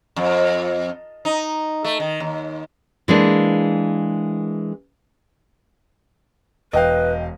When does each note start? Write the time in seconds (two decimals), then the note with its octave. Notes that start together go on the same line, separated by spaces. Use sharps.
0.16 F2
1.25 D#4
1.84 A3
2.00 D#3
2.20 D#2
3.08 E3 G#3 A#3 D4
6.73 E1 B4 D#5 F5 G5